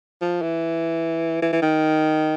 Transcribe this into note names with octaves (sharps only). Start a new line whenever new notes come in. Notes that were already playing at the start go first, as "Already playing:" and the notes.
F3
E3
E3
E3
D#3